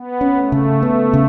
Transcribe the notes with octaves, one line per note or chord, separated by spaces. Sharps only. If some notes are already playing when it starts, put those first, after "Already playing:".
Already playing: B3
C#4
A3
C#3
B3
C#3